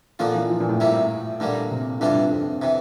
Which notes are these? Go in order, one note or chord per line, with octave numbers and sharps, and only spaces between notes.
F2 A#2 D3 F3 A#3 F4
E3
F3
A#2
A2
C3 G3 A#3 E4
G2 A#2 D3 G3 A#3
C3
G2 D3 E3 G3 D4 F4
C3
F2
C3 E3